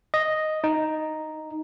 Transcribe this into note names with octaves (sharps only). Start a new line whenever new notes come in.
D#5
D#4